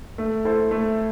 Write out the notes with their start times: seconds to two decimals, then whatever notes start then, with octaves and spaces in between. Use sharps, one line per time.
0.18 A3
0.45 E4 A4 C5
0.71 A3